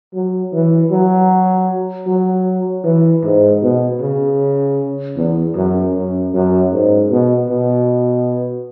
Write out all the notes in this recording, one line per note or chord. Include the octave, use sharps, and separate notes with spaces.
F#3
E3
F#3
F#3
E3
G#2
B2
C#3
E2
F#2
F#2
F#2
G#2
B2
B2